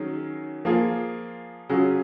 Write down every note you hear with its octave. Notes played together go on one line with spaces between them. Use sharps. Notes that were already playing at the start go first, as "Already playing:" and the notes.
Already playing: D#3 F#3 C#4 G#4
F3 A#3 F4 G#4
C#3 F#3 C#4 F4 G#4